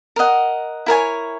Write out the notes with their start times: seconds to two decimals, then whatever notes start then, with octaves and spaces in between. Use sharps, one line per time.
0.16 A#4 D#5 F#5
0.86 E4 A#4 C#5 G#5